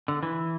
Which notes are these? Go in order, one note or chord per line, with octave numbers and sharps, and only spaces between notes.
D3
E3